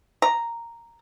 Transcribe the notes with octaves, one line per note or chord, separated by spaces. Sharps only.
A#5